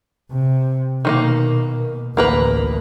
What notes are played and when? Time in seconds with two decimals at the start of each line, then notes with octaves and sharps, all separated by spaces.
0.31 C3
1.05 B2 D#3 G#3 A#3
2.17 A1 D2 A#3 A#4 B4